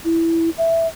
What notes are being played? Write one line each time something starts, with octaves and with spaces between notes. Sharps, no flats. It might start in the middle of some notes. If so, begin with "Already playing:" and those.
E4
E5